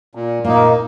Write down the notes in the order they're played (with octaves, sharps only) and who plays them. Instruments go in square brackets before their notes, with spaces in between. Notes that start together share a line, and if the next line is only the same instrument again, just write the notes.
[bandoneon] A#2
[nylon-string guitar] A#2 [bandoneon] A#3 D#4